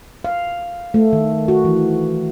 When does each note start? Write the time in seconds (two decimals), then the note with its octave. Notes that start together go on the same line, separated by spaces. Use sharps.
0.24 F5
0.94 A3
1.13 D#3
1.48 F#4
1.65 E3